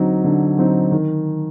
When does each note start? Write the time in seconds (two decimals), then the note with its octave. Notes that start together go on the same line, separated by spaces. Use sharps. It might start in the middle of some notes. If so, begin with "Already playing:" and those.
Already playing: D3 F#3 C4 D#4
0.24 D3
0.58 F#3 C4 D#4
0.92 D#3